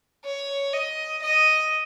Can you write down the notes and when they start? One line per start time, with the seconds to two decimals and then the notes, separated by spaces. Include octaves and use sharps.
0.24 C#5
0.73 D#5
1.22 D#5